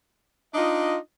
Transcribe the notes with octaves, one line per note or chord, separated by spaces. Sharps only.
D4 D#4 F4 D#5